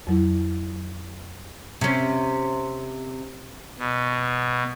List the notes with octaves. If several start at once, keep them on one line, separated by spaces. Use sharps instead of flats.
F2 F#3 E4
C3 C#4
B2